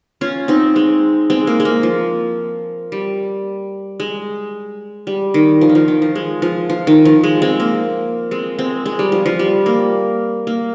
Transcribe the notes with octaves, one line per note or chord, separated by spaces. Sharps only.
C#4 F4
C4 D#4
G#3 C4
G#3 C4
A#3
G#3
A#3
F3
G3
G#3
G3
D#3
F3
D#3
F3
D#3
F3
G#3
F3
F3
D#3
F3
G#3
G#3 C4
A#3
G#3 C4
G#3 C4
G#3
G3
F3
F3
G3
A#3
A#3